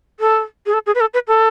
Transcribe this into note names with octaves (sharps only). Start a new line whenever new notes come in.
A4
G#4
A4
G#4
B4
A4
B4
A4